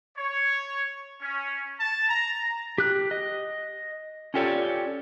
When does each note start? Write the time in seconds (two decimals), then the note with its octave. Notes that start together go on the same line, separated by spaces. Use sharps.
0.17 C#5
1.22 C#4
1.80 A5
2.09 A#5
2.78 G4 F#6
3.11 D#5
4.34 C#4 F4 G4 A4 C#5 D5